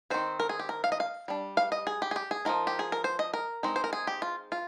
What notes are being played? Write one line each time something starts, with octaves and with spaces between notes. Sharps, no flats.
D#3 G#3 C4 C5
A#4
G#4
G4
A#4
F5
D#5
F5
G3 D4
F5
D#5
G#4
G4
G#4
G4
G#4
F3 G#3 D#4 A#4
G4
G#4
A#4
C5
D#5
A#4
G#3 C4 D#4
C5
A#4
G#4
G4
F4
F4